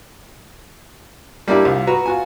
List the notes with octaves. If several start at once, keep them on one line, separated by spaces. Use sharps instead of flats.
G3 A#3 D4 E4
C2 F4
F#4 B4 A#5
F4 F#4 G#5